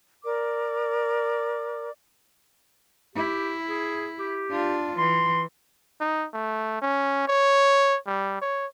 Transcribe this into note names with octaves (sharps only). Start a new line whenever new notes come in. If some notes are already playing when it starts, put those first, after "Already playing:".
A#4 D5 D6
E4 G4
G#4
G4
D4 F4
E3 C6
D#4
A3
C#4
C#5
G3
C#5